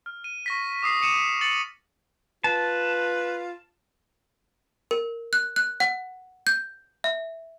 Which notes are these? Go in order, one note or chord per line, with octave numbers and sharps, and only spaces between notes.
F6
D#7
C#6 A#6 B6
D6 D#6 C7
D#6 C#7 D#7 E7
A6 C#7 F#7
F4 B4 A5
A#4
F#6
F#6
F#5
G6
E5